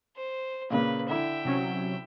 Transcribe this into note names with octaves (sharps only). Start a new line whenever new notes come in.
C5
A#2 C#3 A#3 B4
D3 E4 E5 G5
C3 F#3 C#4